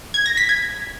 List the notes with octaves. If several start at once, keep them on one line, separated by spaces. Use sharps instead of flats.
G#6
A#6
B6
G#6